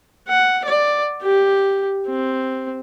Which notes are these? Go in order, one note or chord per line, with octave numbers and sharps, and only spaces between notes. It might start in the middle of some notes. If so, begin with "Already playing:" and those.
F#5
D5
G4
C4